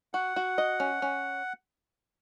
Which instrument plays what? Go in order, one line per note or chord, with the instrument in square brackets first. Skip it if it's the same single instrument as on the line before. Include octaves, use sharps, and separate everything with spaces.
[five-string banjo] F#4 [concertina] F#5
[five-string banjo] F#4
D#5
C#4
C#4